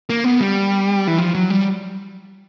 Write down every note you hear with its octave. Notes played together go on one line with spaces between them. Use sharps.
A#3
B3
G3
E3
F3
F#3
G3